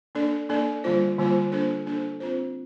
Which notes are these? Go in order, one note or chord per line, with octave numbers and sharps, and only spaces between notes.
A#3 D4 A4 D5
A#3 D4 A4 D5
D3 G3 A#3 F4 C5
D3 G3 A#3 F4 C5
A#3 D4 A4 C5
A#3 D4 A4 C5
C4 F4 C5